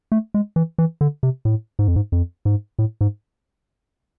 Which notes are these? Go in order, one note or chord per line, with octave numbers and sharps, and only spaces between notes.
A3
G#3
E3
E3
D3
C3
A2
G#2
F2
G#2
F2
G#2
A2
G#2